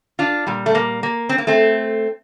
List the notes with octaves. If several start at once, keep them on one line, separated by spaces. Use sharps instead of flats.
D4 F4
A#2 G3
A3
A#3
A#3
C4
A#3
A3 C4